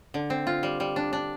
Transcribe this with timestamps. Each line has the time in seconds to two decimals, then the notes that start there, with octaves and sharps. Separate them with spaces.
0.14 D3
0.30 C4
0.47 F4
0.63 G3
0.80 G3
0.96 D4
1.13 D4